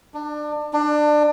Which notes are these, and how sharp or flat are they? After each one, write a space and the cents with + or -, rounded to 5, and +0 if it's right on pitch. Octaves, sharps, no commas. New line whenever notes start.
D4 +25
D4 +25